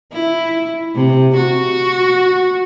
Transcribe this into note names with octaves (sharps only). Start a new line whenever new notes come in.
E4
C3
F#4